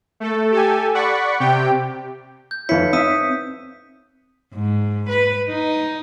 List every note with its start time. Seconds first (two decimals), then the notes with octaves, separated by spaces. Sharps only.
0.20 A3 A4
0.52 G4 A4 G#5
0.94 D5 F#5 B5 C#6
1.40 C3 G4 G5
2.51 G6
2.69 F2 D#4 E4 B4 C#5 B6 C#7
2.93 C4 E5 D#6 B6 D#7
4.54 G#2
5.09 B4
5.48 D#4